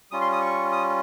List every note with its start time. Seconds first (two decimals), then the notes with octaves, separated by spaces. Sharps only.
0.11 G3 C#4 F4 D#6
0.21 C6
0.32 D#6
0.42 C#6
0.72 D#6